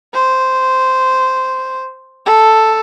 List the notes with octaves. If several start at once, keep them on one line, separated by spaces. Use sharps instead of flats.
C5
A4